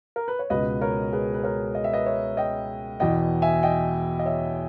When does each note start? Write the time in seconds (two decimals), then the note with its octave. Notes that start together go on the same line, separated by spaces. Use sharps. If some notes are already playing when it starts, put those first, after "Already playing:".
0.16 A#4
0.28 B4
0.39 C#5
0.50 C#2 B2 B4 D#5
0.81 A#4 C#5
1.13 G#4 B4
1.34 B4
1.43 A#4 C#5
1.75 D#5
1.84 E5
1.94 B4 D#5
2.06 C#5 E5
2.37 D#5 G5
3.00 E2 B2 D#5 G5
3.42 E5 G#5
3.63 D#5 G5
4.19 D#5
4.25 C#5 E5